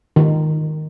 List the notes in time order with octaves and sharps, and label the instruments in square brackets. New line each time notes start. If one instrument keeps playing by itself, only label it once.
[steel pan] D#3